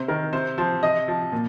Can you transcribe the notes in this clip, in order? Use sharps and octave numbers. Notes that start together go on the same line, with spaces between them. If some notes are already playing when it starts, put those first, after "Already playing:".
Already playing: C3 C5
D#3 A#4
C3 C5
F3 C5
C3 D#5
F3
A#2